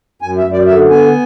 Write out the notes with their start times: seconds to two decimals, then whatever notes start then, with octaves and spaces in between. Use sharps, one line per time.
0.22 F#2 G#5
0.38 E5
0.45 F#2
0.52 D5
0.67 D3 E5
0.90 B3 G#5